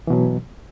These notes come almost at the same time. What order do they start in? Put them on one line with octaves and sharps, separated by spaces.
E3 B2 F#3